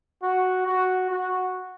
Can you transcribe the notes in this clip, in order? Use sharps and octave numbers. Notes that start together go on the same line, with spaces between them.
F#4
F#4
F#4